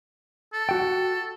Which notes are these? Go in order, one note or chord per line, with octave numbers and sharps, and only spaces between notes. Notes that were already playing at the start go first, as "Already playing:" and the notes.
A4
F#4 G5